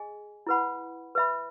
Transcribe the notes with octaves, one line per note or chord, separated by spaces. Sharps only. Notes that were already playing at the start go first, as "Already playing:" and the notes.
Already playing: G#4 D#5 G#5
E4 B4 F#5 B5
B4 E5 B5